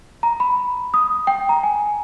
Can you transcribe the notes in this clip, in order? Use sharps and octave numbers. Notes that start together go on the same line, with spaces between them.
A#5
B5
D#6
G5
A#5
G#5